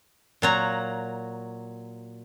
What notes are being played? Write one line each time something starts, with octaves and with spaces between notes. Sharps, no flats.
A#2 F#3 A#5